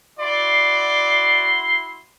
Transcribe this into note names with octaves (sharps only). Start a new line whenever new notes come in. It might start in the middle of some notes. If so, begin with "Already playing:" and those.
E4 F#4 D5 C6